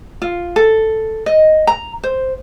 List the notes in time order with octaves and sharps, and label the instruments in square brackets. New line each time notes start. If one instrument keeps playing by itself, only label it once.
[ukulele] F4
A4
D#5
A#5
C5